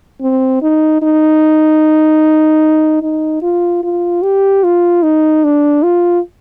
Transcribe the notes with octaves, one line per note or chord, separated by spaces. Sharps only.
C4
D#4
D#4
D#4
F4
F4
G4
F4
D#4
D4
F4